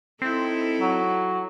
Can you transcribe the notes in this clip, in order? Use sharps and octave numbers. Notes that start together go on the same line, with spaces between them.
C4 D#4 E4 A4
F#3